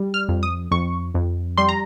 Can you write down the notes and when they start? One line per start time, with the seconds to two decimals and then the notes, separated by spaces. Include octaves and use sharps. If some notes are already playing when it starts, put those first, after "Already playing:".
Already playing: G3
0.14 F6
0.28 F2
0.43 D#6
0.71 F2 C#6
1.15 F2
1.57 G3 C6
1.69 A#5